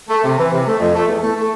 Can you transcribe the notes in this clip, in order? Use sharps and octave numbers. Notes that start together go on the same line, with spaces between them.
A3
C3
E3
C3
A3
F2
A3
E2
A3
A3